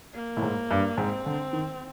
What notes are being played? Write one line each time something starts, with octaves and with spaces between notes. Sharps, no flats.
A#3
A2
G#2
G2
G#2 C4
D3
D#3